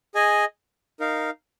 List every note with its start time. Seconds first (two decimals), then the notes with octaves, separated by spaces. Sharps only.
0.15 G#4 D#5 G#5
1.00 D#4 A#4 F5